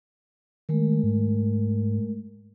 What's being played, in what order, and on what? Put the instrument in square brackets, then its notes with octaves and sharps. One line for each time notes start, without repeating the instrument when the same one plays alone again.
[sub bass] D#3 [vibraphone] G#3 A3 A#4
[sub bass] G#2